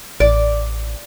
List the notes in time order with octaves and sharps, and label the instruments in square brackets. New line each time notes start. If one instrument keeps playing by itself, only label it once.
[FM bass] A1 [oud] D5